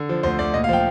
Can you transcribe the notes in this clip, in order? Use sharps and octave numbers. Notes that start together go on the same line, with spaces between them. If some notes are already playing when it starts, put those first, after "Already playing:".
Already playing: D3
F3
D2 C5
D2 D5
A#2 D#5
F5
F3 G5